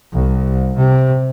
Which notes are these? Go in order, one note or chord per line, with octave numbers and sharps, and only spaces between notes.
C2
C3